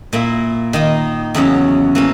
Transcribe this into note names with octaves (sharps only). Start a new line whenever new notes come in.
A#2 A#3 E4
D#3 A#3 D#4
E2 C#3 F#3 C#4
E3 A#3 C#4